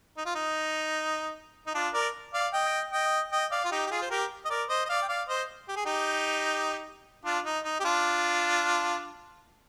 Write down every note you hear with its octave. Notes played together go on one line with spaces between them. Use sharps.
D#4
F4
D#4
D#4
D4 F4
A#4 D5
D5 F5
D#5 G5
D#5 G5
D#5 G5
D5 F5
F4
D#4 G4
G4
F4 G#4
C5
G4 A#4
D#5
A#4 D5
C5 D#5
D#5
D5 F5
G5
D5 F5
C5 D#5
G4
G#4
D#4 G4
D4 F4
D#4
D#4
G4
D4 F4